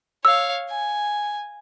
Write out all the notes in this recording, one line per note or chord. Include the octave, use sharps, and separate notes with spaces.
C#5 F5 E6
G#5